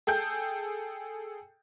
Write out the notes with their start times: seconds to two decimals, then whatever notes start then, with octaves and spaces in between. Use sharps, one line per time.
0.07 G#4 A4 G5 G6